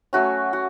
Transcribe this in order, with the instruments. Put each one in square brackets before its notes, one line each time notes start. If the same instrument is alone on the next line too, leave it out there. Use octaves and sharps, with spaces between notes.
[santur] F#3 A3 C#4 F#4
F#4